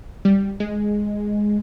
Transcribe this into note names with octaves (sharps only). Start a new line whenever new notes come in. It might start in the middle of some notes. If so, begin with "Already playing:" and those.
G3
G#3